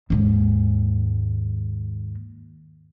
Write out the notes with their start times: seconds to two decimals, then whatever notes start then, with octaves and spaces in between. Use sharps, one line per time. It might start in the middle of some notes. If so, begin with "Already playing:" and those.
0.10 D#2 G#2